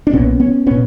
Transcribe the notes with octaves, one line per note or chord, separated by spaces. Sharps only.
D4
B1 A#2 B3 C#4
B3 C#4
A#2 B3 C#4